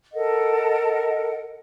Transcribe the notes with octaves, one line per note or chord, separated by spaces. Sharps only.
A4 A#4 D#5 F#5